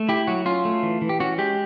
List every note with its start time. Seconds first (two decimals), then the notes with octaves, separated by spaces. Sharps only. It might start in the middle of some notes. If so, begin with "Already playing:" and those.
Already playing: A3
0.09 E4 G4
0.27 F#3 F#4
0.46 C#4 F4
0.65 A3
0.83 E3
1.02 E3
1.09 G4
1.20 C#4 F#4
1.38 G#3 G4